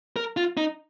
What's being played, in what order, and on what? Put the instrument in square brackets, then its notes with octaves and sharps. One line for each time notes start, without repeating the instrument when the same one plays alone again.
[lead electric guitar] A#4
F4
D#4